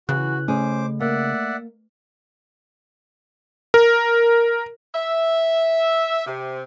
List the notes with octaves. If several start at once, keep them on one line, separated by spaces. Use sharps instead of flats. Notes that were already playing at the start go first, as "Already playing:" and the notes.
C#3 E3 F#4 F#6
A3 C#4 G#4 C5 D6
A#3 D5 E5 F#5
A#4
E5
C3